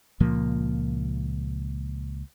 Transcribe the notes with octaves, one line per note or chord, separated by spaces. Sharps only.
C#2 A#2 F3 A#3